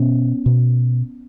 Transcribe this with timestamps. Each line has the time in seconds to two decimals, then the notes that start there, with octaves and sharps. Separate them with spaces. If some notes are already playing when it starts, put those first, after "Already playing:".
Already playing: B2 B3 C#4
0.46 B2